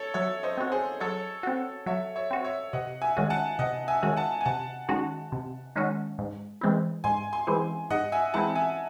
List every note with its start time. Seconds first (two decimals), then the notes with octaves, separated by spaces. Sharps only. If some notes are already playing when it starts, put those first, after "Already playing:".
Already playing: A4 C#5
0.14 F#3 C#5 E5
0.43 C5 D#5
0.57 C4 F#4
0.72 G#4 C5
1.00 F#3 A4 C#5
1.43 C4 F#4
1.86 F#3 C#5 E5
2.16 C#5 E5
2.31 C4 F#4
2.44 C#5 E5
2.73 C3 D#5 F#5
3.02 E5 G#5
3.17 D#3 G#3 C#4 F#4
3.30 F#5 A5
3.59 C3 D#5 F#5
3.88 E5 G#5
4.03 D#3 G#3 C#4 F#4
4.16 F#5 A5
4.41 G#5
4.45 C3 F#5 A5
4.88 D#3 G#3 C#4 F#4
5.32 C3
5.76 D#3 G#3 C#4 F#4
6.18 G#2
6.61 E3 G#3 C4 E4
7.04 G#2 G#5 C6
7.33 G#5 C6
7.47 E3 G#3 C4 E4
7.90 G#2 D#5 F#5
8.12 E5 G#5
8.34 E3 G#3 C4 E4 F#5 A5
8.55 E5 G#5